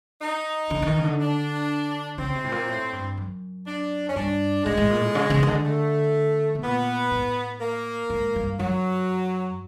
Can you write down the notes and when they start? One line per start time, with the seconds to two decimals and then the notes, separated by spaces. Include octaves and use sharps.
0.21 D#4
0.70 D3
0.82 D3
0.86 D#3
0.99 C#3
1.04 D3
1.20 D4
2.18 C#3 C4
2.35 C3
2.45 A2
2.52 A#2
2.68 A2
2.93 G2
3.17 F#2
3.67 D4
4.09 C#4
4.16 G2 D4
4.65 G#2 G#3
4.77 A2
4.90 A#2
5.01 A2
5.15 C#3
5.30 C#3
5.43 C#3
5.47 D3
5.64 A3
6.55 B2
6.62 A#2 B3
7.11 A2
7.60 A#3
8.10 G#2
8.36 G2
8.59 F#2 F#3